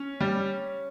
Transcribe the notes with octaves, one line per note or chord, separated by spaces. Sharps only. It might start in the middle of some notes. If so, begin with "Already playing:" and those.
Already playing: C#4
G3